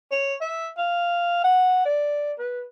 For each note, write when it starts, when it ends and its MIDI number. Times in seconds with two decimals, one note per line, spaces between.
0.11 0.35 73
0.41 0.69 76
0.77 1.42 77
1.43 1.83 78
1.85 2.33 74
2.39 2.63 71